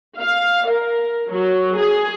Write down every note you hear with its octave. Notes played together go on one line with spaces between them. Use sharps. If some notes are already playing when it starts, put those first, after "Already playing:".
F5
A#4
F#3
G#4